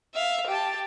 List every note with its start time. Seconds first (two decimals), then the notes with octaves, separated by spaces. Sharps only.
0.15 E5 F5
0.47 G4 A5